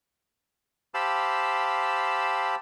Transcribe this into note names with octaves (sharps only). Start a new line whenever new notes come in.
G4 C5 F5 A5 B5 E6